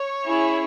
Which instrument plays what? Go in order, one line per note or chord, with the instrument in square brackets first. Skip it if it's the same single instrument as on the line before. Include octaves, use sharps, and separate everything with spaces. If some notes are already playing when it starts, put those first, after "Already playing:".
Already playing: [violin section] C#5
C#4 E4 G#4